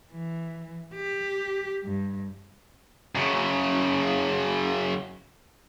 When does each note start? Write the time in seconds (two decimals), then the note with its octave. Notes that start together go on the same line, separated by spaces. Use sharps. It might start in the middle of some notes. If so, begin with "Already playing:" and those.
0.12 E3
0.94 G4
1.84 G2
3.15 F#2 C#3